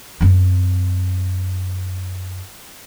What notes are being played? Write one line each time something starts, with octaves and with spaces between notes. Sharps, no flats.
F#2 C4